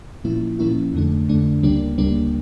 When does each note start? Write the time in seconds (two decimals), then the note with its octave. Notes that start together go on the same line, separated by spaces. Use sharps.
0.24 A#2 F3 A#3 C#4 E4
0.59 A#2 F3 A#3 C#4 E4
0.94 F2 D3 A3 D4
1.28 F2 D3 A3 D4
1.63 D2 C#3 G3 A#3 D4
1.98 D2 C#3 G3 A#3 D4